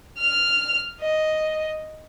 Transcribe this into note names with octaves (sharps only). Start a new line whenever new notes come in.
F6
D#5